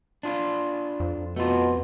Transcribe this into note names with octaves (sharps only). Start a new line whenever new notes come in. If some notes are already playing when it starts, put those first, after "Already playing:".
D4 F4 F5
F2
B2 A3 F4